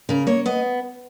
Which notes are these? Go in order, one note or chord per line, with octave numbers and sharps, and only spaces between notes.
C#3 A#4
A#3 C#5
B3 D#5